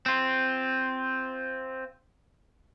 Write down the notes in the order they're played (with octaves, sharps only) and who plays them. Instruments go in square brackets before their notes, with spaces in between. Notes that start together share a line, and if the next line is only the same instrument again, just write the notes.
[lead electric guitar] C4 F4